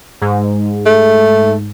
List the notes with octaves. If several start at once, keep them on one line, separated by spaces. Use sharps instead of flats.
G#2
A3